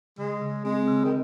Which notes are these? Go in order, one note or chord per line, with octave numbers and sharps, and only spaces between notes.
C#3 G#3
C#3
G#3 C4
C#3
D#3